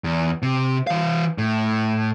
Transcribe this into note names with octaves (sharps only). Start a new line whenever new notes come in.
E2
C3
E3 F5
A2